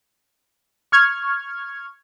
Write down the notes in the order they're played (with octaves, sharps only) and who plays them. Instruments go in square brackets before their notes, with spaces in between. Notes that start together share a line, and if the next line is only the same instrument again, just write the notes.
[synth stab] C#6 F6 G#6